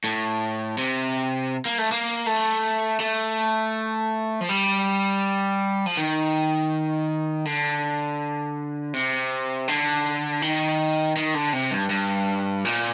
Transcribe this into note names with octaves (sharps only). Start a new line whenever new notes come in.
A2
C3
A#3
A3
A#3
A3
A3
F3
G3
F3
D#3
D3
C3
D3
D#3
D#3
D3
C3
G2
G2
A#2